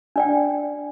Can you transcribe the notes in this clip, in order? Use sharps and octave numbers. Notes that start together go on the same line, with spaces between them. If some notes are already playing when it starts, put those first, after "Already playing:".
D4 D5 G5